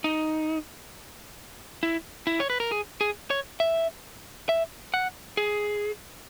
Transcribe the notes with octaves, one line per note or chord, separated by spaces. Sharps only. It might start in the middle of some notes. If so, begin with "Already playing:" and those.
D#4
E4
E4
C#5
B4
A#4
G#4
G#4
C#5
E5
E5
F#5
G#4